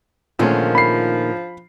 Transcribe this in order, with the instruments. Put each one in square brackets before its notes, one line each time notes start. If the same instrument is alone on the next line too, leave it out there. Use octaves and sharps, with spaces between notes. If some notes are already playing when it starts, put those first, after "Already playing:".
[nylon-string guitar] A#2 D#3 A3 [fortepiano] D3 G#3 C#4 [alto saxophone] F3
[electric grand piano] B5 C7